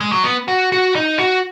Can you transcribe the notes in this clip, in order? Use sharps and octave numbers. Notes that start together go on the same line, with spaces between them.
G#3
F#3
B3
F#4
F#4
D#4
F#4